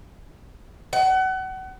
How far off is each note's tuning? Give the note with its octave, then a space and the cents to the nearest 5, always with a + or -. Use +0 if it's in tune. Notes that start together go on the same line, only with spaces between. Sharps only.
F#5 +30